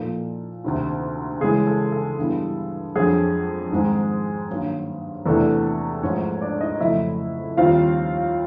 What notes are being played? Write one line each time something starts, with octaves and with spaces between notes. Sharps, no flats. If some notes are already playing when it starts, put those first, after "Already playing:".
Already playing: A#2 F3 A#3 D#4 A4
D2 C3 D#3
C#3 E3 G#3 G#4
A4
A4
G2 E3 G3 B3
F2 D3 F#3 G#4
G#2 D#3 G#3 C4 D#4
G2 D#3 F#3 A#3 C#4
E2 C3 E3 A3 D4 A4
G#2 F3 A3 C#4 C#5
D4 D5
D#4 D#5
F2 C#3 F#3 A3 E4 E5
D#2 D#3 G3 C4 F4 F5